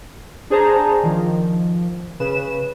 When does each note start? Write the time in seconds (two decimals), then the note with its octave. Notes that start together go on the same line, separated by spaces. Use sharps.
0.50 D4 G#4 C5 A5 A#5
1.03 D#3 F3
2.20 C#3 B4 E7